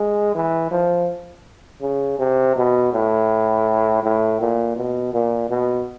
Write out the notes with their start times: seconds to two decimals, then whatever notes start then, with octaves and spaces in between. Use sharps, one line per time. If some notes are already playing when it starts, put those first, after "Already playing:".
Already playing: G#3
0.35 E3
0.71 F3
1.82 C#3
2.19 C3
2.56 B2
2.92 A2
4.03 A2
4.40 A#2
4.76 B2
5.13 A#2
5.50 B2